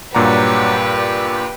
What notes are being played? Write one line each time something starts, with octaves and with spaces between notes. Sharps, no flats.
G2 A#2 F#3 G4 B4 D5 F#5 A#5
D5